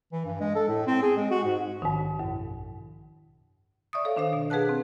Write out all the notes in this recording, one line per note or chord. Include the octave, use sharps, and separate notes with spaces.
E3
G2
G#3
A4
A2
C4
G#4
G#3
F#4
G#2
A#1 G#2 D#3
F#2 B2
D5 E5 C#6 D#6
A4 C#5 F5
D#3 D4 C5 F5
B2
G#4 B4 F#5 A5 F#6
C4